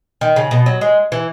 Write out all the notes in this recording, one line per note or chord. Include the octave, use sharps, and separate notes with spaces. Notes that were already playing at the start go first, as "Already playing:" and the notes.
D#3
C#3
B2
F#3
G#3
E3